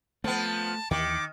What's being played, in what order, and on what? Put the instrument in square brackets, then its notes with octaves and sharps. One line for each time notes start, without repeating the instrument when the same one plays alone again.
[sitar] F3 B3 [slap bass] A3 [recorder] A5
[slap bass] D#2 E3 [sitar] D#3 [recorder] D6